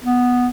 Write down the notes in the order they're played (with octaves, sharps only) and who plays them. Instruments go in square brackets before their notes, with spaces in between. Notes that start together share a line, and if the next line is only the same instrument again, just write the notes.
[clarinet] B3